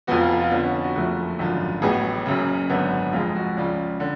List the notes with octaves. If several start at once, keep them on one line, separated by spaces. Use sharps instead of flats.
F1 F2 F3 B3 F#4
F4
F4
F2 D3 F3 B3 D4
C#4
F#4
F#1 F2 F3 A3 F#4
G#1 F#2 D3 F3
A1 A2 F#3 B3 G#4
F#1 F#2 C#3
G#1 F#2 D3 F#3 B3
F1 F2 F3 G#3 F4
F#4
C#2 C#3 F3 D5
D3